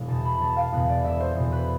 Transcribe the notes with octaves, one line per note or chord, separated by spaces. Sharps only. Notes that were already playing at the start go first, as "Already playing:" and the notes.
Already playing: E1
E2 B2 A5
B5
E1 A5
F5
E2 B2 B4
D5
E1 E5
C5
E2 B2 C5
B4